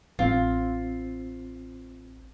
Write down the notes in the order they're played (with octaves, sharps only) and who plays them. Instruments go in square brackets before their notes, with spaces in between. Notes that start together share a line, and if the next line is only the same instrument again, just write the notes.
[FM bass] A1 [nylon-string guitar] C4 [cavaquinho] F4